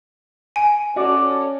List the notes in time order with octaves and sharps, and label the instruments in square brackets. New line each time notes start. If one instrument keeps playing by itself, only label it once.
[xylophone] G#5 [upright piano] D7
[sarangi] C#4 [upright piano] F#4 [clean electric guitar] A4 D5